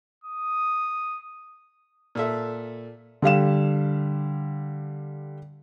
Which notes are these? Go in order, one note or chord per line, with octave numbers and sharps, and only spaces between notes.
D#6
A#2 A4 E5
D3 G3 F5 E7